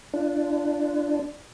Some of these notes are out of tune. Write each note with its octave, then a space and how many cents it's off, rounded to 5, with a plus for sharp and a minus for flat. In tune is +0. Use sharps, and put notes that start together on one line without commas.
D4 +0 F4 -35